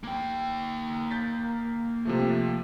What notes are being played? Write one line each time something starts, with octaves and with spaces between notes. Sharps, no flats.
A#3 G5
G6 A6 B6
C3 F3 A3